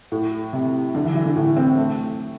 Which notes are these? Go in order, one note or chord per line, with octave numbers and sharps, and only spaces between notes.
A2
C3
D3
E3
E3
D3
A2
C4
A3